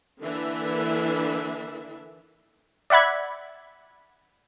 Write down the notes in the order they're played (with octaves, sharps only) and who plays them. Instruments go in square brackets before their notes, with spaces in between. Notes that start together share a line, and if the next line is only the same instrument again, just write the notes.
[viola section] D3 E3 A#3 D4 E5
[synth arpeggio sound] D5 E5 F#5 B5 G#6